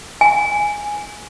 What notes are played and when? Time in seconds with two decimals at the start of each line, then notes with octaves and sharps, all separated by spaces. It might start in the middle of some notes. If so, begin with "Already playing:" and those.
0.21 G#5